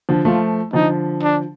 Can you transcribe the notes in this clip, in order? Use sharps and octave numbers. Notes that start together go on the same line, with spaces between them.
D3 F3
F3 A3 F4
D3 F3 D#4
D4